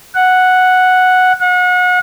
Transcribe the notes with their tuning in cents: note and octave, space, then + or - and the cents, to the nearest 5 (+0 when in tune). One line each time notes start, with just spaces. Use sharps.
F#5 -5
F#5 -35